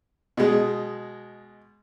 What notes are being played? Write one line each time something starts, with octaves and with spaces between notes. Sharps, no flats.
B2 G#3